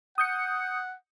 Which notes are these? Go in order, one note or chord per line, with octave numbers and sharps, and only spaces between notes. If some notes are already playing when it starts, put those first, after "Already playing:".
F#5 D#6 G6 C#7